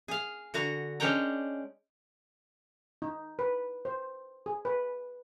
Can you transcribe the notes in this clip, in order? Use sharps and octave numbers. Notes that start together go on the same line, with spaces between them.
G#4 F5
D3 F#4 A#5
G#3 C#4 D4 C#5 G5 A#5
D#4
B4
C5
G#4
B4